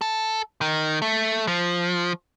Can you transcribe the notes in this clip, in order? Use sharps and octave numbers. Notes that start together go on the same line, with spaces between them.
A4
D#3
A3
F3